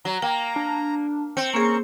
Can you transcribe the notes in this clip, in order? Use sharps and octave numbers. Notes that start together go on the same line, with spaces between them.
F#3 A#5
A#3 G5
D4
C4 G5 C#7
A#3 C#4 G#4 A#4 C#6